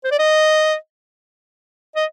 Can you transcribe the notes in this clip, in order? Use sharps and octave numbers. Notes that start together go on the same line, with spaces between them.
C5
D5
D#5
D#5